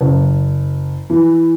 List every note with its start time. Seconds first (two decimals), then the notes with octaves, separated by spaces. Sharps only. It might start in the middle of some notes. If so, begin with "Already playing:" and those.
0.01 F#1
1.10 E3